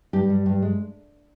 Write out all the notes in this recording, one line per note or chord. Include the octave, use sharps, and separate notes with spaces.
G2 G4
G3
G2
G#3